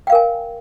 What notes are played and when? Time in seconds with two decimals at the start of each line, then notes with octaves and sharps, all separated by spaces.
0.07 G5
0.10 F5
0.12 A#4
0.15 G#5